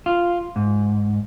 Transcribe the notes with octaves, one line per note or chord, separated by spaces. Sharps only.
F4
G#2